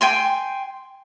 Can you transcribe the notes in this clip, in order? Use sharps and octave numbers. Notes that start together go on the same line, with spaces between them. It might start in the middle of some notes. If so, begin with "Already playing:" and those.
G5 G#5 C6